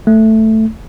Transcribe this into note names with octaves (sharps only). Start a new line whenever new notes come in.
A3